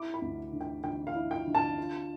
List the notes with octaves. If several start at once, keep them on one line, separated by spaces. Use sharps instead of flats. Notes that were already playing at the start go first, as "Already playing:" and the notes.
Already playing: E4 D6
B5
D2
D3
G5
D3 G5
F5
E4
G5
D3
A5
F4